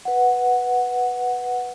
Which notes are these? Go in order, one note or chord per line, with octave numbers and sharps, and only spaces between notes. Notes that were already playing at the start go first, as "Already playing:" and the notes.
B4 F#5